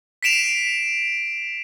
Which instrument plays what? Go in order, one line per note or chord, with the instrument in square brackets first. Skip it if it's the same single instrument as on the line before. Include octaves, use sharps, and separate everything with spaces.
[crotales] B6 C7 D7 E7 F7